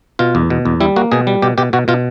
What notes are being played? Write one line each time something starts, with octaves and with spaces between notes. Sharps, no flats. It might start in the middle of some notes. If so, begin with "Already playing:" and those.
B2 F4
E2
B2
E2
G3 E4
A#3 F#4
B2 G#4
G3
B2 G4
B2 G4
B2 F#4
B2 F4